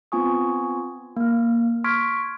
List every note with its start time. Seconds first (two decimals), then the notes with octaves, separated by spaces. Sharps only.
0.12 B3 C4 F4 G#5 C#6 D#6
1.17 A#3 F6
1.84 C6 C#6 F6 G#6 B6 D7